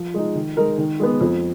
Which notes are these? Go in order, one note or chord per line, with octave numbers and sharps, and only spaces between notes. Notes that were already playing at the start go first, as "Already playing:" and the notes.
Already playing: F3
G#3 D#4
D#3
G#3 D#4 A#4
D#3
G#3 B3
F2